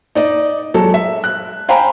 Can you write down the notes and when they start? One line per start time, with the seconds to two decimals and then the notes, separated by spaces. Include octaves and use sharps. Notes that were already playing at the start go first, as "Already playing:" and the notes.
0.15 D#4 D5 D#5
0.74 F#3 G#3 A4
0.94 E5
1.24 F#6
1.68 C5 F5 G5 G#5 A#5 B5